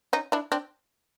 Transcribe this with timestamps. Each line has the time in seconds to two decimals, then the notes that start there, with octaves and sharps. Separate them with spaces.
0.13 C#4 D#4
0.32 D4 E4
0.52 C4 D4